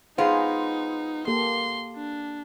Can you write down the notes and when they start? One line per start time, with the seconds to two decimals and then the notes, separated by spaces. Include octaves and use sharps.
0.18 G#3 B3 D#4 F4 G#4 C5
1.27 A#3 G4 A4 C6
1.96 D4